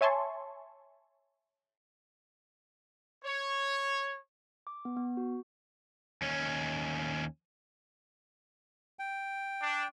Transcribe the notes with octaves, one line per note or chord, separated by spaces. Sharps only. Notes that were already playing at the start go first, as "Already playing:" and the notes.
C#5 E5 G#5 A5 C6 C#6
C#5
D6
B3
B3
F#4
D#2 C#4
G5
D4